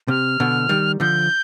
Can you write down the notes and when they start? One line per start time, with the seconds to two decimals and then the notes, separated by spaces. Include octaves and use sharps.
0.08 C3 F6
0.40 B2 D3
0.69 D#3 G3
1.00 D3 F3 G6